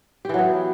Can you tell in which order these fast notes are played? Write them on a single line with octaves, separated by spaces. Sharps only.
G4 E3 F#3 B3